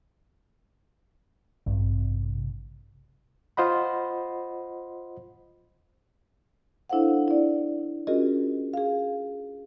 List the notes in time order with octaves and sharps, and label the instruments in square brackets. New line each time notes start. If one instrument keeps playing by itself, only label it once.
[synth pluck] A1 G2 C3
[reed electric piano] F4 C5 D#5 F#5 B5
[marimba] D4 E4 A4 C5 F5 F#5
E4 D5
C#4 F4 F#4 G#4 A#4 D#5
G#4 F5